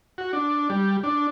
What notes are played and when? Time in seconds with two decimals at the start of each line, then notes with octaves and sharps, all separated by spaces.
0.18 F#4
0.33 D4
0.70 G3
1.03 D4